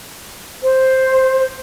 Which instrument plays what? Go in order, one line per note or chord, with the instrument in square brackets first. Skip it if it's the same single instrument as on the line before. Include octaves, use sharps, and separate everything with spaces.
[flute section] C5